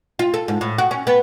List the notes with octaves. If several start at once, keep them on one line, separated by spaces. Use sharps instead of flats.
F4
A4
G#2
A2
F#4
C#4
B3